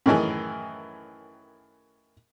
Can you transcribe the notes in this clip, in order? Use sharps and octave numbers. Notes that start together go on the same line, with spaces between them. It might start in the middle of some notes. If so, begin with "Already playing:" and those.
F#2 A2 D#3 E3 G#4